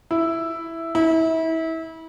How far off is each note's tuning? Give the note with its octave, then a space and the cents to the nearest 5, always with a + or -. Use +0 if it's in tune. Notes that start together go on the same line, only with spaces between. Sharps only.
E4 +0
E4 -30